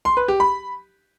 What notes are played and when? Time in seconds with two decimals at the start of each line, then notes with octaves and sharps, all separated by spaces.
0.05 C6
0.17 B4
0.28 G4
0.40 B5